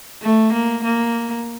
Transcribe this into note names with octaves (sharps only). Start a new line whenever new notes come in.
A3
A#3
A#3